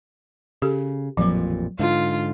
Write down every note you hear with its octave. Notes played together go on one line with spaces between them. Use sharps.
C#3 G4 A4
A1 F2 A#2 F3 F#3
G#2 D3 F4